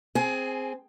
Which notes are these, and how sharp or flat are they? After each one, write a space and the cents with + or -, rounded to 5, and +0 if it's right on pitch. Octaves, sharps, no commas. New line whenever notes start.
C4 +0 G#4 +0 G#5 +25